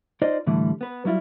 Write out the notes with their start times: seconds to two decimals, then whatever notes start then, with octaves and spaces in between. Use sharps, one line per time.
0.22 D#4 F4 C5 D5 D#5
0.47 A2 D3 E3 G3 A3
0.81 B3 B4
1.05 F#3 G3 E4 F4